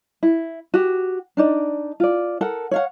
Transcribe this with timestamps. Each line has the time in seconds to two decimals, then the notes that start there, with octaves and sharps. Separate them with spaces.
0.23 E4
0.74 F#4 G4
1.37 D4 D#4 D5
2.00 F4 D5
2.41 A4 A#4 F#5
2.71 C#5 F5 F#5